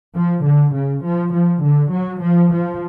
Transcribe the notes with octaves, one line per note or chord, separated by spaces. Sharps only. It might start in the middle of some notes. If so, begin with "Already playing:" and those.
F3
D3
C#3
F3
F3
D3
F#3
F3
F3